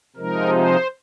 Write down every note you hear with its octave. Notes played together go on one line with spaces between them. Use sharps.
C3 F3 G#3 D#4 A#4
C5